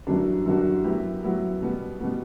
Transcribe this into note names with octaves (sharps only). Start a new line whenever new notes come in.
F#2 E3 G3 D4 F#4
F#2 E3 G3 D4 F#4
F#3 B3 E4 G4
F#3 B3 E4 G4
B2 G3 B3
B2 G3 B3